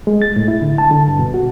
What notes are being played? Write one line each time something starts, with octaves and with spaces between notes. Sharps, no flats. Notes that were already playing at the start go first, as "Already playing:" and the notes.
G#3
A6
A2
E4
D3
A5
D3
G2
B2
F#4